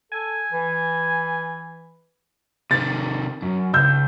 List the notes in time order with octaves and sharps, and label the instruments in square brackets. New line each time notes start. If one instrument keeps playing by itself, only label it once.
[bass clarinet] A4 [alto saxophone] G#5
[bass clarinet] E3
[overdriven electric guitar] C3 D#3 [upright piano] A6
[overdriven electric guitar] F#2
[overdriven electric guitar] C#2 [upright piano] E6 G6